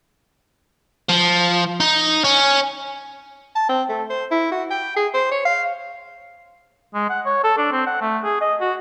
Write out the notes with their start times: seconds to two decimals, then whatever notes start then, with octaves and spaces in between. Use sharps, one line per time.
1.09 F3
1.80 D#4
2.24 C#4
3.55 A5
3.69 C4
3.89 A3
4.10 C5
4.31 E4
4.52 F#4
4.71 G5
4.96 G#4
5.14 C5
5.31 C#5
5.45 F5
6.94 G#3
7.10 F#5
7.26 C#5
7.44 A4
7.58 D4
7.72 C4
7.87 F#5
8.02 A3
8.24 G#4
8.41 D#5
8.61 F#4